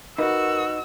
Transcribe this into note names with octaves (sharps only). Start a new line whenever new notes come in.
D#4 F#4 A#4 B4 E6